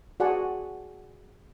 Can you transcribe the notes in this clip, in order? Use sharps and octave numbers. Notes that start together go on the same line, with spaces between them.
F#4 G#4 D5 F#5 G#5 A5